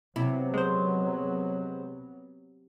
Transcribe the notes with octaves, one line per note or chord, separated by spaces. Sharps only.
C3 F#3 B3 E4
G#3 C5